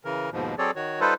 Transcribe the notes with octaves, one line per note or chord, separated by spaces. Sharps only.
C#3 E3 A#4
D#2 G#2 B2 F3
F#3 C4 G#4 A4 C#5 D5
D#3 F#4 C#5
G3 D#4 F4 A4 B4 C5